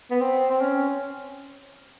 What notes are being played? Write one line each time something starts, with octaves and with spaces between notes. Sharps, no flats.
B3
C4
C4
C#4